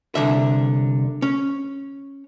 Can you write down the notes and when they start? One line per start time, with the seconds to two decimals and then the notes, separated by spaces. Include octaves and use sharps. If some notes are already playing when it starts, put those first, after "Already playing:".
0.15 C2 D3 E5
1.22 C#4